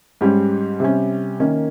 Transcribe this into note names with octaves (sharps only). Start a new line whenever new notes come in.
G#2 G3 C#4
C3 G3 C#4
D#3 A#3 C#4